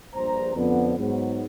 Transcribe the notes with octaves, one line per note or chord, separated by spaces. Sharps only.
A#1 G2 C5 A#5
F2 D3 B3
G#2 F#3 B3